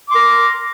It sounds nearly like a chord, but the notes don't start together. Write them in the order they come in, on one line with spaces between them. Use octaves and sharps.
D6 C6 A#4